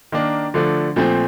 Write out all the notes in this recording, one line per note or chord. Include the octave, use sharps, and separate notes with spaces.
D#3 A#3 D4
D3 F3 A3 D4
A#2 F3 A3 C4